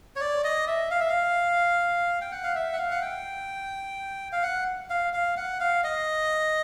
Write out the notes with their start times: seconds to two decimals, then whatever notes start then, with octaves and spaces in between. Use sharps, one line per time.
0.16 C#5
0.20 D5
0.44 D#5
0.67 E5
0.91 F5
1.00 E5
1.09 F5
2.21 G5
2.32 F#5
2.44 F5
2.55 E5
2.73 F#5
2.78 F5
2.91 F#5
3.02 G5
4.32 F5
4.43 F#5
4.90 F5
5.13 F5
5.37 F#5
5.60 F5
5.84 D#5